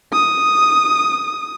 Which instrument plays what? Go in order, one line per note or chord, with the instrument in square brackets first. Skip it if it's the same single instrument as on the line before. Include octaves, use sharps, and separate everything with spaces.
[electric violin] D#6